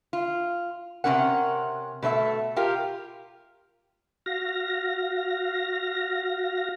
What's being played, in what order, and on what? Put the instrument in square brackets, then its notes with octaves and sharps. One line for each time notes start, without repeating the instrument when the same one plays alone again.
[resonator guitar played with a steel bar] F4
C3 F3 C#4 A#4 F#5
B2 A3 C5 E5
F4 G4 A#4 F5
[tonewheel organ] F#4 F5 A#6